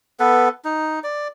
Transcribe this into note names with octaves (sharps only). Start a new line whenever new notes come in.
B3 A4 B4
D#4
D5